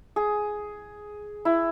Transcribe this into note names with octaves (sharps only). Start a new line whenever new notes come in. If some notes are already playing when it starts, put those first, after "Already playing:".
G#4
E4